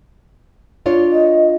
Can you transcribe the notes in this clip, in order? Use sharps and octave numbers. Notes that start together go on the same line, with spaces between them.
D4 F4 C#5
D#5